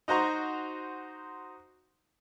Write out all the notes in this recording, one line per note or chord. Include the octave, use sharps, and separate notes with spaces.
D#4 F#4 C5 A#5 C#6